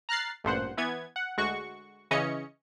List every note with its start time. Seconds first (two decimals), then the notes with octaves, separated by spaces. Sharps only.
0.09 A#5 F6 F#6 A6 C7
0.44 A1 G2 A#2 C5 F#5
0.78 E3 B3 G#6
1.16 F#5
1.37 D2 G#3 F#4 C#6
2.11 C#3 E3 C#4 D#5 C#7